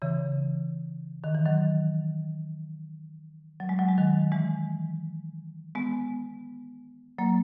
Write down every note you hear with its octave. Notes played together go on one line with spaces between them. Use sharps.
C#3 E3
D#3
E3
D#3 F#3
F#3
G#3
F#3
G#3
D#3 F#3
E3 G#3
G#3 B3
F#3 A#3